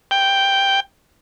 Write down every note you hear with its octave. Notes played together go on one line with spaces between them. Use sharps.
G5